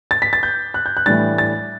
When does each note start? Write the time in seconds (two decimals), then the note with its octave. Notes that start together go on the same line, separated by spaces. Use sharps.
0.11 A6
0.22 B6
0.33 A6
0.43 G6
0.74 F#6
0.86 G6
0.97 F#6
1.06 A2 E3 G3 D4 A6
1.38 A6